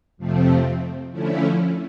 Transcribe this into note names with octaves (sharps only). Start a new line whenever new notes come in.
F2 C3 F3 A3 C4
D3 F3 A3 C#4 E4